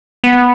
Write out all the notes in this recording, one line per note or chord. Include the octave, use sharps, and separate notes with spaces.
B3